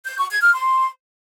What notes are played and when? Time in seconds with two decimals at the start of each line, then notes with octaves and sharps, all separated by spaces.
0.07 G6
0.19 C#6
0.30 G#6
0.42 F6
0.54 C6